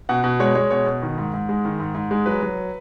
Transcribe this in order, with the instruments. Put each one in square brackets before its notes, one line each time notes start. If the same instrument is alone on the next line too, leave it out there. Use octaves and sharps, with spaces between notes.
[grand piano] B2 F#5
B2
G#3 C#5
G#3 C#5
B2 C#5
B2
D#3
G#2
G#2
G#3
D#3
G#2
G#2
G#3
F#3 B4
F#3